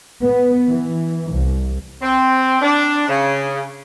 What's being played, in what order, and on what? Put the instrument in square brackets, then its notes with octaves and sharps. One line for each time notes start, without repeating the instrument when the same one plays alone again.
[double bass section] B3
E3
C2
[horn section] C4
D4
C#3